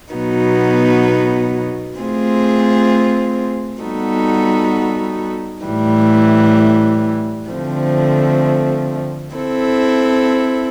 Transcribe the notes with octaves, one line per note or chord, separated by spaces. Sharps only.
B2 F#3 B3 D#4
A3 C4 F4 G#4
G3 B3 D#4 F#4 A4
A2 E3 G3
D3 F3 A3 C4
C4 E4 A4